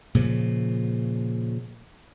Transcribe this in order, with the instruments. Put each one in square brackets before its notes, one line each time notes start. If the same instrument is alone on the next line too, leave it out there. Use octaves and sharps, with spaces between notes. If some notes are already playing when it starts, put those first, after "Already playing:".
[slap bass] A#2 C#3 F3